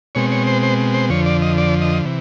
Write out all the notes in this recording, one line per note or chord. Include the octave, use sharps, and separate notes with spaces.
B2 G#3 C4 C#5
C#5
C5
C5
C5
F2 D3 F3 C#5
D5
D#5
D5
D#5
C3 E3